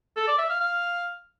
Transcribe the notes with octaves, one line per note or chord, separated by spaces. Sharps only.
A4
D5
E5
F5
F5